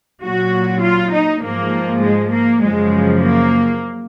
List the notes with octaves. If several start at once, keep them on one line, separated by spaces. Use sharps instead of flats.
A#2 F#3 F#4
F4
D#4
G#2 F3 A#3
G#3
A#3
F#2 C#3 F3 G#3
A#3